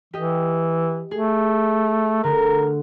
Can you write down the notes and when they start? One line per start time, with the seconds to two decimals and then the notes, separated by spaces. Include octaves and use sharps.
0.13 E3 G4 D#5
1.11 A3 G#4
2.24 D3 A3 A#4